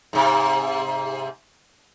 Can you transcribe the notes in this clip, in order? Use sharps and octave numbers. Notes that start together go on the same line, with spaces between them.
G#2 C3